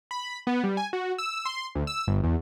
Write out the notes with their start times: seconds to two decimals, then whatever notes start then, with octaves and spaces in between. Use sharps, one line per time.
0.11 B5
0.47 B3
0.64 G3
0.77 G#5
0.93 F#4
1.18 E6
1.45 C6
1.75 D2
1.87 E6
2.08 G1
2.23 E2